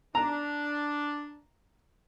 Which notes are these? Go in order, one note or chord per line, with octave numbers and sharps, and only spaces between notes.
D4 A#5